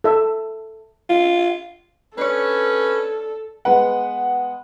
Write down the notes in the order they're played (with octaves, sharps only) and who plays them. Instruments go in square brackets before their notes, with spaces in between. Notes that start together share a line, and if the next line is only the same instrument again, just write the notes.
[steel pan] A4 E5
[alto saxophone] F4
[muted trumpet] C#4 [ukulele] D4 C#5 [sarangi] A4 [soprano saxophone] B4
[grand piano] G#3 B3 B4 F#5